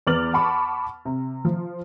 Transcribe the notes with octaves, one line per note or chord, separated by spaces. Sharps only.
E2 B3 D6 F6 A6 F#7
F#5 A5 B5 C#6 D6
C3
F3